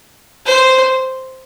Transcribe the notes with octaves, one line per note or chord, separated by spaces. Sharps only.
C5